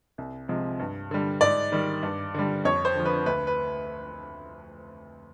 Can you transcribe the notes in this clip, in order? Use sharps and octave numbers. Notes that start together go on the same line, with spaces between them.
C2
C3 F3 G#3
G2
D3 G3
G#2 D5
D#3 G3
G2
D3 G3
F2 C#5
C5
D3 F3
B4
D2 B4
B4